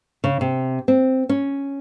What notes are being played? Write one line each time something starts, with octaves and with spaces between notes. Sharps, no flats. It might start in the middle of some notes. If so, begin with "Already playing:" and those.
C#3
C3
C4
C#4